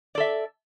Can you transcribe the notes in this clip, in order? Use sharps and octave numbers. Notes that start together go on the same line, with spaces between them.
A4 D5 E5